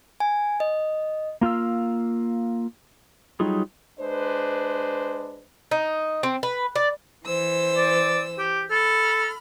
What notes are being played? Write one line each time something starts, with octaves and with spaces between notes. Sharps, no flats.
G#5
D#5
A#3 F4 F5 E6
F#3 G3 D#4 F4 G#4
G#3 D4 B4 C5
D#4
C4
B4
D5
E3 C5 E6
D5
G4
A4 B5 F6